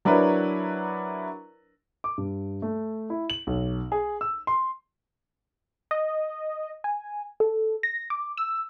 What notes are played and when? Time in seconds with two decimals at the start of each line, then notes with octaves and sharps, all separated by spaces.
0.05 F#3 D4 E4 A#4 B4 C#5
2.04 D6
2.18 G2
2.62 A3
3.10 E4
3.30 F#7
3.47 B1
3.92 G#4
4.21 E6
4.47 C6
5.91 D#5
6.84 G#5
7.40 A4
7.83 A#6
8.10 D6
8.37 E6